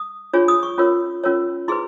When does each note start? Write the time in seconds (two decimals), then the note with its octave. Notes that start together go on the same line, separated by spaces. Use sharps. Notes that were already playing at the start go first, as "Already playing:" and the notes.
Already playing: D#6
0.33 D4 F4 G#4 C#5
0.48 D#6
0.63 C#6
0.78 C#4 F4 A#4 C#5
1.23 C#4 F4 A#4 C#5
1.68 E4 G#4 B4 C6